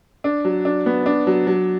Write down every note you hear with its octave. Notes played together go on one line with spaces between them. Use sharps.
D4
F#3
D4
B3
D4
F#3
F#3